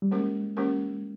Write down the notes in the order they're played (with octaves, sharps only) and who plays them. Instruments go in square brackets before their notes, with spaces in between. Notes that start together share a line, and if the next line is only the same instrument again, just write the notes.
[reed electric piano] G3
[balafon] E3 A#3 C#4 G4 A#4 [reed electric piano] G#3
[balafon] E3 A#3 C#4 G4 A#4